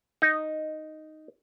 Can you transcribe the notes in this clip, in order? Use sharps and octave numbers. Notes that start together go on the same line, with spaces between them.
D#4